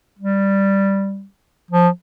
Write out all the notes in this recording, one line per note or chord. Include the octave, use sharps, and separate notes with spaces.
G3
F3